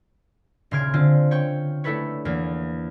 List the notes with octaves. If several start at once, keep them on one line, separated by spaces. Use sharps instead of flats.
D#1 C#3 C6 F6 G#6 D7
D3 C4 F4
C#5 G5 C#6
A3 D4 E4 A4 B4 C#5
E2 A#3